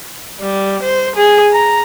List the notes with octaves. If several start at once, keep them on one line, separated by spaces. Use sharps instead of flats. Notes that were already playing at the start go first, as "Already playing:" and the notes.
G3
C5
G#4
A#5